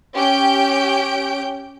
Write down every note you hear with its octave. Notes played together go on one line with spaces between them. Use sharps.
C#4 G4 G5 G6 D7